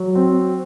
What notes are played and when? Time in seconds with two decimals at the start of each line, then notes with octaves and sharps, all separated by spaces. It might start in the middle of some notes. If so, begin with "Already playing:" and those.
Already playing: F#3
0.15 C4